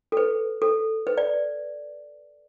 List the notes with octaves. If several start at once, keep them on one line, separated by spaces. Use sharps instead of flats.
A4
B4
A4
B4
D5